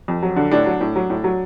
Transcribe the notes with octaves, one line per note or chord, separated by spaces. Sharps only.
F2
F#3
D3
A2 D4
F#3
A2
F#3
A2
F#3